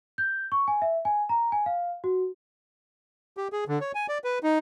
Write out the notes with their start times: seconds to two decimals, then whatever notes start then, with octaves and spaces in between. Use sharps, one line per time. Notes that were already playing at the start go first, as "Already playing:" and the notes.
0.18 G6
0.52 C#6
0.68 G#5
0.82 E5
1.05 G#5
1.29 A#5
1.52 G#5
1.66 F5
2.04 F#4
3.37 G4
3.53 G#4
3.68 D3
3.81 C#5
3.95 G#5
4.09 D5
4.24 B4
4.43 D#4